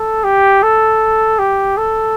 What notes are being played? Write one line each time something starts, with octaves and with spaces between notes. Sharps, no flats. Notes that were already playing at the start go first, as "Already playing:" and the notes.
Already playing: A4
G4
A4
G4
A4